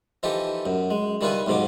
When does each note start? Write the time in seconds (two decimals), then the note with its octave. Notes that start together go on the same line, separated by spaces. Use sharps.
0.23 E3 F3 D#4 G4 A4
0.66 F#2
0.91 G#3
1.21 D#3 G3 E4 F4 B4 G#5
1.46 B1 G#2 B2 F3 D6